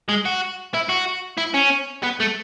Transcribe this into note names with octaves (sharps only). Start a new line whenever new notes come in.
G#3
F#4
E4
F#4
E4
C#4
B3
A3